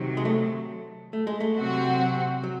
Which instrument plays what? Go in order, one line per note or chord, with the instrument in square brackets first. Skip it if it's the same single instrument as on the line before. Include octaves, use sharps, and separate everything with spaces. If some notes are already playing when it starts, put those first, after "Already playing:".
Already playing: [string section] C3 D#3 F#3
[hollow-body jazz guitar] G#3
A3
A3
G#3
A3
[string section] C3 F#3 C4 F#4
[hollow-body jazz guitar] F#3